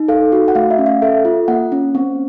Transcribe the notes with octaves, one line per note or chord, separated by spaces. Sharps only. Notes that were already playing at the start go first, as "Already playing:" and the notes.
Already playing: D#4
A4 F5
F#4
F#5
A3 F5
E5
C#4
F5
A4 E5
F4
A#3 F#5
C#4
C4